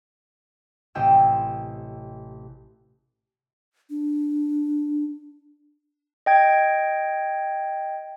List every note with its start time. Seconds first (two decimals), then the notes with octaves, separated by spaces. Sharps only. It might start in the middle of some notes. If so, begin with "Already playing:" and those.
0.95 A1 C3 D#5 G5 G#5 E6
3.90 D4
6.26 D#5 G5 G#6